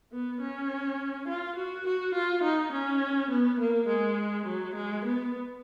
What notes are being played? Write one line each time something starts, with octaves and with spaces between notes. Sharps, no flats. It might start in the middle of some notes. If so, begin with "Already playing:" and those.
B3
C#4
F4
F#4
F#4
F4
D#4
C#4
B3
A#3
G#3
F#3
G#3
B3